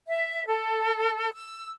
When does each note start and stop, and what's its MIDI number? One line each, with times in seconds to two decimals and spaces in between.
0.08 0.46 76
0.46 1.30 69
1.33 1.71 88